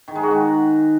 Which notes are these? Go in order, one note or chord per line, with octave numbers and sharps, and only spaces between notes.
D#3
G#3
F#4
D#3